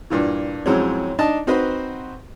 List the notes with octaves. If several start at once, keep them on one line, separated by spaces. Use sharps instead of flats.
G2 A#2 E3
F2 A2 F#3 G#3 C4 C#4
D4 D#4 D#5 A5
C4 D#4 F#4 B4 C5